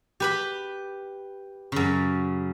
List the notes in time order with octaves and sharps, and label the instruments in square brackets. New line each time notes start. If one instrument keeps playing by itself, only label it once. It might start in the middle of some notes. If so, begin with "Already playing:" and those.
[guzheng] G4 B4 B5
F#2 C#3